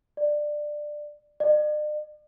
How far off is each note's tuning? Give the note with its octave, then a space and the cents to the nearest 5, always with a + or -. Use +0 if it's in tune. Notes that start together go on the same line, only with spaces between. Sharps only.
D5 +15
D5 +45